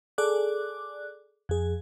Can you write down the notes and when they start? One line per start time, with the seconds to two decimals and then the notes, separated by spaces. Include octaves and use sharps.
0.18 G#4 A4 D5 D6 F#6
1.49 F2 G#4